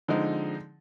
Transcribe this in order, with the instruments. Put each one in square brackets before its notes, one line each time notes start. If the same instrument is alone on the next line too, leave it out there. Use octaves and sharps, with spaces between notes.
[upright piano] D3 F3 G#3 C4 D#4